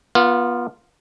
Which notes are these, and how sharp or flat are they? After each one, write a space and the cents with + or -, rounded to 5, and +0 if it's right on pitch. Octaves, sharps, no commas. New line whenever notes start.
B3 -30 F4 +0